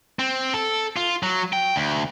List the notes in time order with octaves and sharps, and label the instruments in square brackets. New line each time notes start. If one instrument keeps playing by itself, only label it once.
[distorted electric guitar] C4
A4
F4
F#3
G5
D2